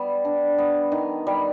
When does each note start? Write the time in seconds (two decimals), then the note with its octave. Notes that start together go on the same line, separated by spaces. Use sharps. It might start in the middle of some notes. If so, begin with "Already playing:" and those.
Already playing: G3 B3
0.25 D4
0.58 B3
0.92 D#3
1.27 G3